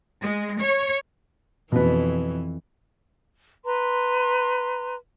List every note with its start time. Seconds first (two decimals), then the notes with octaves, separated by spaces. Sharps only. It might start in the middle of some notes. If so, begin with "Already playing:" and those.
0.20 G#3
0.60 C#5
1.72 F2 B2 E3 B3
3.65 B4 A#5 C6